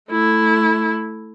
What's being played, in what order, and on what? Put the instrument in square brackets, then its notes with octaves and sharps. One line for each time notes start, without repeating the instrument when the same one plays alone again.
[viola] A3 E4